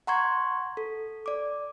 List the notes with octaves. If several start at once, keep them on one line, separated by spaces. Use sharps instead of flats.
F#5 A#5 C6 C#6 G#6
A4
D5 D6